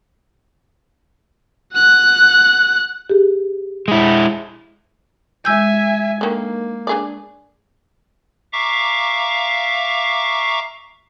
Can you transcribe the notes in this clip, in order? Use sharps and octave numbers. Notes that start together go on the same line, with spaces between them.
F#5 F#6
G4 G#4
G#3 E4
G#3 E5 G#5 E6 G6
D3 D#3 A#3
D4 G#4 D5
E5 F5 A#5 C#6 D6